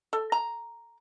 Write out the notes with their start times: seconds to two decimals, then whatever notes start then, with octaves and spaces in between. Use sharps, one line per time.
0.13 A4
0.32 A#5